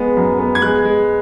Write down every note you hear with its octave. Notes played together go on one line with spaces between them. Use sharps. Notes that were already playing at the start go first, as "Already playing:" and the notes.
Already playing: G#3 B3
F#2
B3
G#6
G#3 F#6
G#3